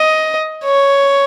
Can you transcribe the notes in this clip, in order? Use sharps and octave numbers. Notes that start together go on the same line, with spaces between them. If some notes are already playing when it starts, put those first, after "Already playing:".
Already playing: D#5
C#5